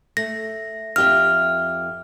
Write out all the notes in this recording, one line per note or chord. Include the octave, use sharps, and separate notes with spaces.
A3 A#6
F2 G4 E5 F6